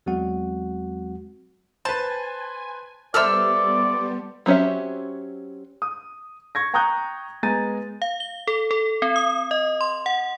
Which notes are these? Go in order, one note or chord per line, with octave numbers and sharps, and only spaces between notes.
E2 F#3 G#3 C4 F#4 F#5
B4 C5 G#5 A5
G3 B3 A4 C5 D5 E5 E6 F6
F#3 C4 C#4 G4 E5
D#6
C#6 G#6 A#6
G5 A#5 C#6 D#6 F#6 G6
G#3 B3 G#5 A#5 A6 D#7
F5
G7
A4
A4
C4
D#6
D#5
C6
F#5